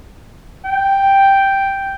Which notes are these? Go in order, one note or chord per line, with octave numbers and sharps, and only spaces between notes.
G5